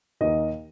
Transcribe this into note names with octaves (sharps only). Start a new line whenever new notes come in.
D#2 D#3 A#3 D#5